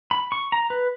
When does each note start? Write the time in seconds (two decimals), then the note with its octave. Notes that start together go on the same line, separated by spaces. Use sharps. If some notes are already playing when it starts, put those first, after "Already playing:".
0.11 B5
0.32 C#6
0.52 A#5
0.70 B4